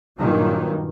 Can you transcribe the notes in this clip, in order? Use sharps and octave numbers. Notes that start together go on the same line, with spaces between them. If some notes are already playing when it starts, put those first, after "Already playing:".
G2 A#2 D#3 F#3